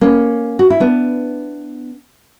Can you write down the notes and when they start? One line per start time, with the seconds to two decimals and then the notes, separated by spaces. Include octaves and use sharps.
0.01 A#3 C#4
0.59 F#4
0.70 E4
0.80 B3 D4